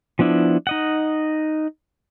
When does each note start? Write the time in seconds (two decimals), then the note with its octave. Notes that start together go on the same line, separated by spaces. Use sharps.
0.19 F3 B3 D4 E4
0.67 D#4 D#5 F#5